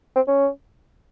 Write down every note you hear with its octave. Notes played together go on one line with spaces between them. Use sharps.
C4
C#4